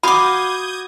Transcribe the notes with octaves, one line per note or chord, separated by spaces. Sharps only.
F#4 F5 B5 D6 D#6 G6 G#6